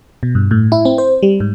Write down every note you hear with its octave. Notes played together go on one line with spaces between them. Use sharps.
B2
G2
A2
E4
C4
C5
G3
G#2